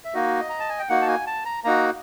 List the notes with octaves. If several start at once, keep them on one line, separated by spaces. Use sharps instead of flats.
E5
A#3 D#4 F#4 D#5
A#5
A5
G#5
G5
A#3 D#4 F#4 F#5
A5
G#5
A5
A#5
A#3 D#4 F#4 A#5